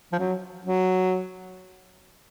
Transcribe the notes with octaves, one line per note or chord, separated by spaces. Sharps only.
F3
F#3
F#3